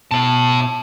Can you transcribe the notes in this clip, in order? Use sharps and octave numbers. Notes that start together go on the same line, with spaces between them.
B2 E4 A5